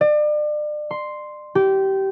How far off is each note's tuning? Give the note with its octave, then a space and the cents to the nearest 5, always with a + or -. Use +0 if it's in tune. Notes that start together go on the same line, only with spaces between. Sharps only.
D5 +35
C6 +0
G4 -20